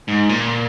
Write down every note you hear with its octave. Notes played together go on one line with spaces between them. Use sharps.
G#2
A#2